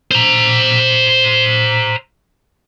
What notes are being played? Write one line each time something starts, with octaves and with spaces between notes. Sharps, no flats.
C5 A#5